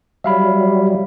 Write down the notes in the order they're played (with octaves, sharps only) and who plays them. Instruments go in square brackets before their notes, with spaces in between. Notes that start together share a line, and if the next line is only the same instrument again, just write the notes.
[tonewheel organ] F#3 G3 [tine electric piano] E5 F5 B5